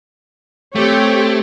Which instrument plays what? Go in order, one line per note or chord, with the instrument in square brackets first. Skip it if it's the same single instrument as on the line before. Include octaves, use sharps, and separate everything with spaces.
[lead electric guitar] A3 [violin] C4 [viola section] G4 C#5 G5